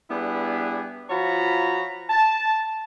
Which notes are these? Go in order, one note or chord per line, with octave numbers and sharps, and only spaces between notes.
G3 B3 D4 E4 G#4 B4
F3 F4 F#4 C#5 A#5 B5
A5